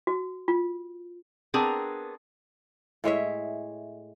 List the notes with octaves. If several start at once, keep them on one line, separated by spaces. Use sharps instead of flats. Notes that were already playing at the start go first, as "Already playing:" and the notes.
F#4
F4
B3 C4 D4 G#4 A#4
A2 G#3 C#5 E5